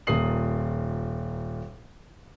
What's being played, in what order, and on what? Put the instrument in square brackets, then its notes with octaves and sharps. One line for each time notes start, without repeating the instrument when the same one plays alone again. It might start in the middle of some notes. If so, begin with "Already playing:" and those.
[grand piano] D#1 A#2 A#4 D#6 C7 F#7